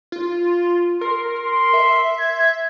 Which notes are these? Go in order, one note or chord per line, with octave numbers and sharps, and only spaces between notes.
F4
A#4 C6
C6
E5
G#6